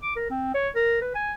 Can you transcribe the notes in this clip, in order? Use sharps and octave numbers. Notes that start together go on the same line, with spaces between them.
D6
A#4
C4
C#5
A#4
B4
G#5